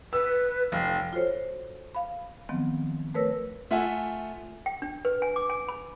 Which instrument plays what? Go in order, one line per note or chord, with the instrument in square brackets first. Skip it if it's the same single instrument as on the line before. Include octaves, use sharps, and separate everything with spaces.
[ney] B4 [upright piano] E6
[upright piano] F1 [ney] F5
[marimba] F4 F#4 A4 C5 C#5
F5 B5
D#3 F3 F#3 B3 C4
A3 A#4 B4 C#5 E6 A#6
[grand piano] A3 F4 E5 F#5 G#5
[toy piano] G5
D4
B4
G#5
D6
G#5
B5